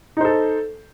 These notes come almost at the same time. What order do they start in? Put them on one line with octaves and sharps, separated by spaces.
D#4 C5 A4